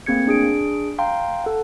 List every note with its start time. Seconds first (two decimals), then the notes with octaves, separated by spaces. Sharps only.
0.06 A3 A#3 C4 G#4 G#6 C#7
0.27 D4 G#4 D7
0.98 F5 G5 A#5 C6
1.44 A4 F#5